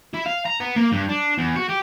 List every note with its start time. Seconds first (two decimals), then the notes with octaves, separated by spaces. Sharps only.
0.14 E4
0.26 F5
0.46 A#5
0.60 B3
0.76 A#3
0.92 G2
1.09 D4
1.38 E2
1.56 F#4
1.69 G4